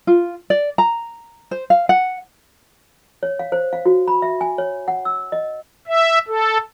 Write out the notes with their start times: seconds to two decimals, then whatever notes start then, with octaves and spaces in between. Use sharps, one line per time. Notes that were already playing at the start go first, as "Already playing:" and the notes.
0.07 F4
0.50 D5
0.78 A#5
1.51 C5
1.70 F5
1.89 F#5
3.23 C#5
3.39 F5
3.52 C5
3.73 F5
3.86 F#4
4.08 B5
4.22 E5
4.41 G#5
4.58 C#5
4.88 F#5
5.05 E6
5.32 D#5
5.87 E5
6.28 A4